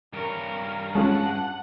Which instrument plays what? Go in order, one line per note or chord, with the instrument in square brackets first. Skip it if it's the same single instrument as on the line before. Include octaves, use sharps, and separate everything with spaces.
[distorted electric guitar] G2 C#5 [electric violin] A#4
[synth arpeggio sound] G#3 C#4 F4 [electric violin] F#5 [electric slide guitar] A5